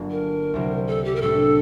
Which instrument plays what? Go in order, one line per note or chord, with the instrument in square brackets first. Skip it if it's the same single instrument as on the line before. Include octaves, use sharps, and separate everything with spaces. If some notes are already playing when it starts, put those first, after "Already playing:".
Already playing: [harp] G1 G2 D3 F#3 A#3 D4 F#4
[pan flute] A#4
[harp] C2 C3 F#3
[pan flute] A4
G4
A#4
[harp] A2 G3 D4 [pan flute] A4